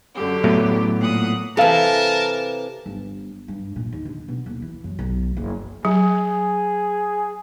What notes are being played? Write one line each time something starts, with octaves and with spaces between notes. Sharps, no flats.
F#2 D3 G4
A2 F#3 B3
A#2 F#5 D#6
C3 E3 A4 A#4 F5 A5
G1
G2
A#2
D#2
D3
B2
D#1
E3
F#2
B1
F#1
F#3 G#4